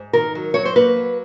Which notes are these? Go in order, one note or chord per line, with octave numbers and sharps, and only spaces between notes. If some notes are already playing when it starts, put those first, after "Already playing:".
Already playing: G#2
D#3 A#4
F#3
F#3 C#5
C5
A#3 B4
F#3